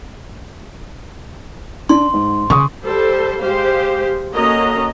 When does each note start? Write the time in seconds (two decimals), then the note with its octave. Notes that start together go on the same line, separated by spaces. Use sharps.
1.89 D4 C6
2.13 G#2
2.50 C#3 C#6 D#6
2.83 G3 A4 C5
3.40 G#3 G4 C5 F5
4.33 A#3 C#4 F#4 A4 D#5 A#5